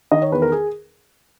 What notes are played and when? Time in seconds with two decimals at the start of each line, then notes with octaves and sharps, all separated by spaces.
0.11 D#3 D#5
0.22 C#5
0.32 E2 B4
0.42 A#4
0.52 G#4